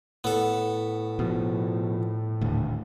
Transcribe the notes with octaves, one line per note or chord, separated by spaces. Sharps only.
A2 B3 A4
B2 F3
D#1 D2